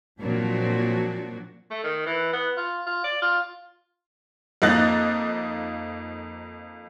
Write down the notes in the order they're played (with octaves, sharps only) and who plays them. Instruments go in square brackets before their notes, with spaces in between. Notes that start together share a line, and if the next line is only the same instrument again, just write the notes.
[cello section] A#2 F3 F#3 C4 D4 F#4
[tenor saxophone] A3
D#3
E3
B3
F4
F4
D5
F4
[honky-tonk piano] F2 A#3 D#4 D#5 F#6 A6